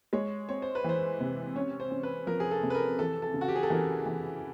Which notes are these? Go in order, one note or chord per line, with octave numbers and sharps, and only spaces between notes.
G#3 C#5
C4 C#5
C5
B4
E3 C5
C3
C#4 C#5
C5
C#4
B4
F3 A#4
G#4
A4
C3
B4
A#4
E3 A4
A4
C#3
F#4
G4
G#4
A4
E3 A#4
E3